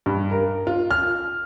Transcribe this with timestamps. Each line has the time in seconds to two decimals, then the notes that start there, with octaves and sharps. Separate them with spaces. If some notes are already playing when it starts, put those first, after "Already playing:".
0.06 G2
0.31 A#4
0.67 F4
0.91 F6